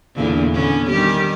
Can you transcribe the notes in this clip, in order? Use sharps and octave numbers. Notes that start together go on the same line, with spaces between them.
E2 A#2 D3
D3 B3 C#4
D#3 G3 G4